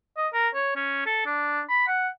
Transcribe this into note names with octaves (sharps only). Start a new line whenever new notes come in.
D#5
A#4
C#5
C#4
A4
D4
B5
F#5